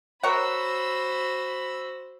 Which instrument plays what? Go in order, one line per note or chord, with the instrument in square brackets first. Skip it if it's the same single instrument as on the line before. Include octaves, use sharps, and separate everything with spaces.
[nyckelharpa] F#4 C5 [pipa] A#4 C#5 F#5 [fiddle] B5 E6